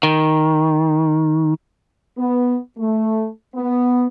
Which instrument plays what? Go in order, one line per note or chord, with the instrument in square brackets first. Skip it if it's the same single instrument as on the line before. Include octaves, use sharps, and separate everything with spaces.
[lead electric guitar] D#3
[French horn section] B3
A3
B3